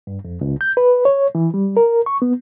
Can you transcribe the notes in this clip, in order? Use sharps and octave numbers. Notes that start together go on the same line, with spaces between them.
G2
F2
C#2
G6
B4
C#5
E3
G3
A#4
C#6
B3